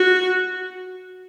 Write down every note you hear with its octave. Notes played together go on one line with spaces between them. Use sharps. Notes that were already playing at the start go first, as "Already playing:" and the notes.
Already playing: F#4